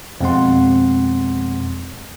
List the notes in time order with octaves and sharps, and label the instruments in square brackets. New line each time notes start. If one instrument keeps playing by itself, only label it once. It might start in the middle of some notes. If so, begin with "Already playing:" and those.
[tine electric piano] F2 B2 G#3 C4 F#5 C6